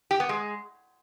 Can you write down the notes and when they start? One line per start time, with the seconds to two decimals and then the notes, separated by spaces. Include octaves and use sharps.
0.11 G4
0.20 B3
0.29 G#3